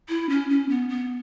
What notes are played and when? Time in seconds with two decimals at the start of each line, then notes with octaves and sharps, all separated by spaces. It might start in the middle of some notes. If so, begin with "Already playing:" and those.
0.09 E4
0.30 C#4
0.49 C#4
0.69 B3
0.89 B3